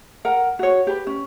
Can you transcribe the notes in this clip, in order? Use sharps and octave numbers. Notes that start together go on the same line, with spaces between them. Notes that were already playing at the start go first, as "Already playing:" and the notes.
A#4 F#5
F#4 C#5
G4 B4
C#4